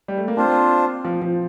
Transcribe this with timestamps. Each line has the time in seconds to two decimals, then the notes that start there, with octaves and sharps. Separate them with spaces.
0.08 G3
0.18 A3
0.28 A#3
0.37 C4 D4 F4 C5
1.05 F3
1.22 F3